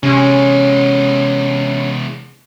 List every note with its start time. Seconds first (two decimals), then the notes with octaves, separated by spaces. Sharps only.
0.03 E2 C3 G#3 C#4